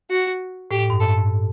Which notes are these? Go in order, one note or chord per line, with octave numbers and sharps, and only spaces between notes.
F#4
A2 G4
G2
A4